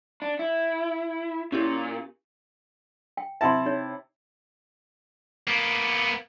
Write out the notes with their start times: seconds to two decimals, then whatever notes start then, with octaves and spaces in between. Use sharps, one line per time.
0.22 D4
0.39 E4
1.52 A#2 C#4 E4 G4
3.17 G5
3.41 C3 E4 E5 G5 A5 C6
3.66 D#4 C#5
5.48 A#3 B3